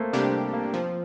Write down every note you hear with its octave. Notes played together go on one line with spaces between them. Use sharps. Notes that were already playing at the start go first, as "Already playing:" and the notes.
Already playing: A3 A#3 C4
C3 G3 A#3 D4 G4
A#3
F3 C4